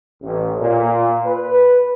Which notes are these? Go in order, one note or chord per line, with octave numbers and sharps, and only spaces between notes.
A1
A#2
B4